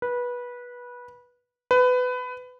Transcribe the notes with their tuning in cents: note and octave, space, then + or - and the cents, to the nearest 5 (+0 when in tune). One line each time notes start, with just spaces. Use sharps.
B4 -20
B4 +20